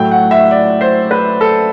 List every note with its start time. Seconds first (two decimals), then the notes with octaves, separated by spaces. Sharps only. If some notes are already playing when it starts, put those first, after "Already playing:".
Already playing: A2 F#3 A3 G5
0.11 F#5
0.31 E5
0.51 D5
0.81 C5
1.11 B4
1.41 A4